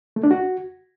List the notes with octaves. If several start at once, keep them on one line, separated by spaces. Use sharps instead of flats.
A3
D4
F#4